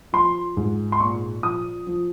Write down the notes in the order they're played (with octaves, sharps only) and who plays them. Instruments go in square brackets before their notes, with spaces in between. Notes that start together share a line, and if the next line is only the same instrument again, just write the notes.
[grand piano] F3 C6
G#2
C6
A#2 C#6
F3 D#6
F3